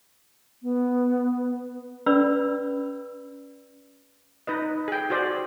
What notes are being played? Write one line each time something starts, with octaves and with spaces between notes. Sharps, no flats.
B3
C#4 B4 D5 B5 E6
D#4 B4 D#5
G#4 G5
F#4 G#4 C5 D5